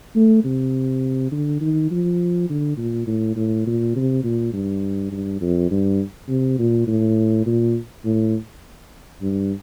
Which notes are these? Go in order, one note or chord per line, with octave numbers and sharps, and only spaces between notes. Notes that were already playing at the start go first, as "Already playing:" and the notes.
A3
C3
D3
D#3
F3
D3
A#2
A2
A2
A#2
C3
A#2
G2
G2
F2
G2
C3
A#2
A2
A#2
A2
G2